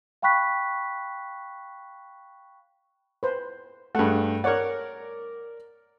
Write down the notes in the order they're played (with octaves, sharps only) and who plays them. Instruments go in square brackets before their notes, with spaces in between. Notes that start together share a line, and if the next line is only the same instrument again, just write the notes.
[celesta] F5 G5 B5 C#6 F#6 B6
[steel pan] B4 C5
[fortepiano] G2 A3 [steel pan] G#4 F#5
[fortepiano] A#4 D5 [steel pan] C#5 F#5